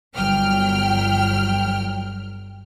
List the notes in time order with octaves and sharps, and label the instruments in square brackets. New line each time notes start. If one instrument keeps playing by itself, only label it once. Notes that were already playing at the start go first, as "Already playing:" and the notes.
[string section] G1 F#3 G5 F6